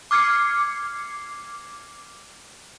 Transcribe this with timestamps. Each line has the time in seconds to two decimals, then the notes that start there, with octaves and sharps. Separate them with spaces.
0.11 D6 F6 G#6 C7 C#7